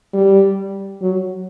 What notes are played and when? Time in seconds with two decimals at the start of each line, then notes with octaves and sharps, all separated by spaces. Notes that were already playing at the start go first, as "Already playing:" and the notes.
0.13 G3
1.01 F#3